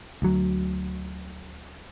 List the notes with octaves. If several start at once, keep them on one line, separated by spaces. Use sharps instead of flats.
D2 F#3